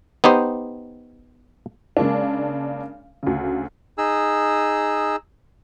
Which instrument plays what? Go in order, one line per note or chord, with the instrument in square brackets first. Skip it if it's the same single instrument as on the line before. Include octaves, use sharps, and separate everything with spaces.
[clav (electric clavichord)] B3 D#4 G4 C5
[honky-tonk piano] C#3 G#3 A#3 D4
D2 C#3
[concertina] D#4 G#4 E6